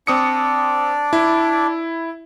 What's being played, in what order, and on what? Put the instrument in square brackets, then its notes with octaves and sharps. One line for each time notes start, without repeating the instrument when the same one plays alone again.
[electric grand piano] C4 D#6 C#7 [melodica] D4 D5
[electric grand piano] E4